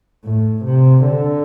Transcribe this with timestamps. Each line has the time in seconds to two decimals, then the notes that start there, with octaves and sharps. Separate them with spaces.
0.25 A2
0.65 C3
1.05 D3